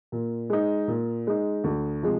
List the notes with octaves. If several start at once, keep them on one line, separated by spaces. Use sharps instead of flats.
A#2
G#3 D#4
A#2
G#3 D#4
D2
C3 F3 G#3